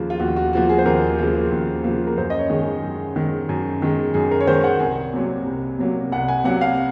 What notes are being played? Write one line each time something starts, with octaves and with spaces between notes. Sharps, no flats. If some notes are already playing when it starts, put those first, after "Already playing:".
Already playing: D#2 C#3 F3 A#3
F4
D#2 F#4
F#4
C#3 F3 A#3 F#4
G#4
C5
D#2 A#4
C#3 F3 A#3
D#2
C#3 F3 A#3
A#4
F#2 C5
D#5
C#5
D#3 G#3
G#4
F#2
D#3 G#3
F#2
D#3 G#3
F#2 G#4
A#4
C#5
D#3 G#3 C5
F#5
C2 G#5
C3 F#3 A#3
C2
C3 F#3 A#3
C2 F#5
G#5
C3 F#3 A#3 F#5
F5